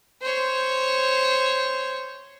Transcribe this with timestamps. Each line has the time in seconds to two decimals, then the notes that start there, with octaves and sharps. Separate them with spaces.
0.22 C5 C#5